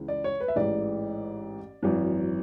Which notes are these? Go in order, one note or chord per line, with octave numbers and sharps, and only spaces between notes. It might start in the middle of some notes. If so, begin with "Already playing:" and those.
Already playing: C#2 C#3 E3
D5
C#5
B4
E5
A1 G#2 E3 D5
G#1 F#2 E3